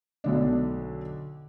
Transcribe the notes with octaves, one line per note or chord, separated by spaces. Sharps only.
B1 D3 D4